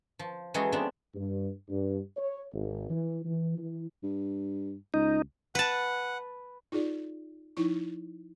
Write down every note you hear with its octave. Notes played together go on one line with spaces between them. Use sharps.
F3
E3 F#3 G#3 C#4 G#4 A4
F3 B3 C4 D4
G2
G2
C#5
G#1
E3
E3
E3
G2
C#2 D#4
B4 F#5 A5
D#4 F4 G#4 D5
F3 D#4 E4 C#6